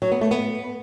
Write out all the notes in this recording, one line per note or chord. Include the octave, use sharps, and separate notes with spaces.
F#3
B3
A3
B3